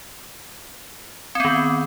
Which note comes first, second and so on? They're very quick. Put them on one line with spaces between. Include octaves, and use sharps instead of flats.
C4 B3 D#3